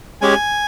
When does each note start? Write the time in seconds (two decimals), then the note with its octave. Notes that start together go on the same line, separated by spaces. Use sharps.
0.21 G#3 C#4 G4 G#5